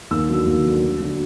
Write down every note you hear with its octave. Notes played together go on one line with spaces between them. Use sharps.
D#2 E6
D3 F#3
D#2
D3 F#3
D2
D3 F#3